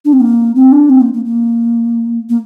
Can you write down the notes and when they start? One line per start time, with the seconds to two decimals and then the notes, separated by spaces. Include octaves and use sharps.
0.05 D4
0.13 C4
0.20 A#3
0.55 C4
0.72 D4
0.90 C4
1.01 A#3
1.14 A#3
1.25 A#3
2.30 A#3